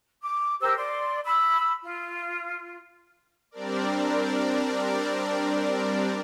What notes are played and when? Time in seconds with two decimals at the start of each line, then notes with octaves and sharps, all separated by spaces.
0.22 D6
0.60 G4 A#4 C5 E6
0.76 D5 C6
1.24 B5 E6
1.83 F4
3.51 G3 C4 D4 A#4 D5